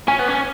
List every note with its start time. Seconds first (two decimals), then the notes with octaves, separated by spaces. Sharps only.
0.08 C#4 G#5
0.19 B3
0.28 C#4